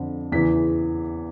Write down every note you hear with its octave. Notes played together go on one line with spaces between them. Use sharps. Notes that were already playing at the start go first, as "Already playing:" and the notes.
Already playing: F2 D3
E2 C#3 E3 B6